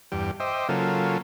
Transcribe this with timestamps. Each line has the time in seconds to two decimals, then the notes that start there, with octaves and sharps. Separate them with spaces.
0.12 E2 G2 G4
0.40 C5 D#5 E5 G5 D6
0.69 C#3 F#3 A#3 F4 A4